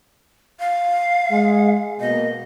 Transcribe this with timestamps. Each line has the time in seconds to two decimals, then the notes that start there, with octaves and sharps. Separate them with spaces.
0.60 F5
1.31 G#3
2.00 B2 A#3 D#5